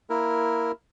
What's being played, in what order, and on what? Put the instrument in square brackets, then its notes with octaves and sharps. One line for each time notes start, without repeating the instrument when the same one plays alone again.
[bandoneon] A#3 E4 A#4